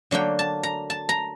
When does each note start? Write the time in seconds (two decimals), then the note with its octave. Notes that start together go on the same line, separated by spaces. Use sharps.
0.11 D3 F#3 A#3 D4 G5
0.39 A5
0.63 A#5
0.90 A5
1.09 A#5